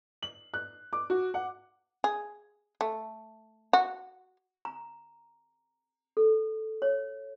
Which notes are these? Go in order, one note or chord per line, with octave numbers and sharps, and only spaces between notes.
F#7
F#6
D6
F#4
F#5
G#4
A3
F#4
A#5
A4
C#5